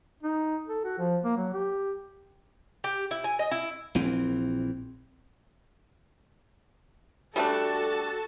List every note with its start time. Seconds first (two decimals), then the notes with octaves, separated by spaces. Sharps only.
0.23 D#4
0.67 A4
0.85 F#4
0.98 F3
1.24 A#3
1.37 F#3
1.53 G4
2.84 G4
3.11 E4
3.24 G#5
3.39 D#5
3.51 E4
3.95 A#1 E3 C4
7.36 G3 A3 D4 F#4 A4 A5